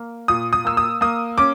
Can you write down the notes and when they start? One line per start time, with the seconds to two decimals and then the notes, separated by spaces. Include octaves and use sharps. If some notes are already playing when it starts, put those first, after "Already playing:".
Already playing: A#3
0.28 A#2 D#6
0.53 D#6
0.65 A#3 E6
0.77 D#6
1.01 A#3 D#6
1.38 C#4 D6